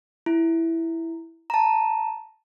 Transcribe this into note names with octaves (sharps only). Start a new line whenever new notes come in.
E4
A5 A#5